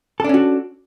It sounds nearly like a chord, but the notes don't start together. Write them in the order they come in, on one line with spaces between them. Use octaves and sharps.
A4 D4 C#4 F#4